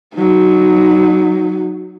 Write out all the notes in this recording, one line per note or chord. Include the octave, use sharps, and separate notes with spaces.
F#3 D#4